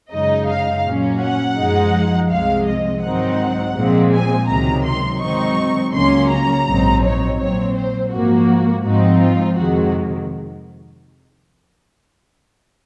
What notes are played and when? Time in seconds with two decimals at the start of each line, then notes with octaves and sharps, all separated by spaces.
0.12 F#2 C#3 G#3 D#4 D#5
0.48 F5
0.84 A#2 F#3 C#4
1.20 F#5
1.57 F#2 F3 G#3 D#4
2.29 C2 C3 F3 G#3 F5
2.66 D#5
3.02 G#2 D#3 F#3 C4 D#4 F#5
3.75 A#2 F3 G#3 C4
4.11 G#5
4.48 C#2 C3 D#3 F#3 A#5
4.84 C6
5.20 G#2 D#3 F#3 C4 D#4 C#6
5.93 C#2 C#3 F#3 A#3 C#4 C6
6.30 A#5
6.66 A#1 G#2 F#3 C4 D#4
7.02 C#5
7.38 A#2 F#3 C4 C#5
7.75 C5
8.11 G#2 F3 A#3 F#4
8.84 G#2 F3 C4 D#4 F#4
9.20 F4
9.57 F2 C3 D#3 G#3 F#4